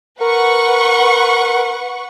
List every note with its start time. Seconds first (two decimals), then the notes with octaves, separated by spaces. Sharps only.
0.21 A#4 B4 F#5 C#6